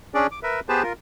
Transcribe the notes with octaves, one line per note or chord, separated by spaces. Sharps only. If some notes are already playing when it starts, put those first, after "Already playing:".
C#4 D4 G#4 D5
D6
A#4 B4 E5
B3 G4 G#4 B4 C5 A5
F4 A#4